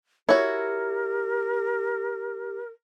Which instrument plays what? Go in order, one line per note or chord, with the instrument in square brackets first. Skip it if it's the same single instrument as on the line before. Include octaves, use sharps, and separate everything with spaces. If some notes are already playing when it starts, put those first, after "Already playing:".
[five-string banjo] E4 F#4 [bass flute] G4 [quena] A#4 [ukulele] C#5